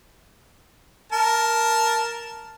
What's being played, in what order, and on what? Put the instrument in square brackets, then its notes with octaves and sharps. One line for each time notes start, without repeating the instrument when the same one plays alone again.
[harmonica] A#4 A5